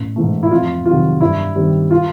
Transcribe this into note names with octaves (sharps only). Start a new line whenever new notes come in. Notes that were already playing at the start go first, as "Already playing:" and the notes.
Already playing: A1
G#2 E3 A3
E4
F2 F4
C3 D#3 F#3 F4
G2 E4
D#3 G3 C4
F4